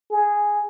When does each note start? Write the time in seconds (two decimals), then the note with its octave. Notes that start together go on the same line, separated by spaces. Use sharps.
0.11 G#4